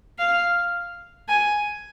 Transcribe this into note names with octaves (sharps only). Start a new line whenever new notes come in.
F5
G#5